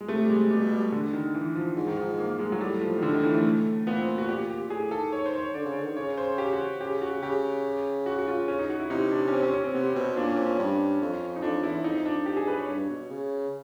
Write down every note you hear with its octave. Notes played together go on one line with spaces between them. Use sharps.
G#3
C3 A3
G3
G#3
B2 G3
G3
D3
D#3
E3
F3
G#2
D#3
F3
A#3
G#3
F#3
A2 G3
F3
D#3
D3
D#3
E3
A3
A#2 B3
C4
F#4
A#2 G4
G4
A2 G#4
D#3 A4
C#5
C5
C#5
D3 D5
C#3
D3
D#3
C#3 C#5
C5
G4
F#4
C#3 G4
F#4
C#3 G4
F#4
F#4
F4
C#4
D#4
F#4
E4
C3 D#4
D4
C#4
C4
C#4
C#4
C4
C3 B3
B2 C4
A#2 D4
C#4
C4
C#4
G2
F2
D#4
F2 D4
E2 E4
F2 D#4
D4
G4
G#4
B4
C#5
G2
B2
C#3